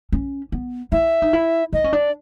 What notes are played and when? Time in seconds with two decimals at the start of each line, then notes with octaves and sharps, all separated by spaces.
0.12 C#4
0.52 B3
0.92 E4 E5
1.22 D#4
1.33 E4
1.73 D#4 D#5
1.84 C#4
1.93 D4 D5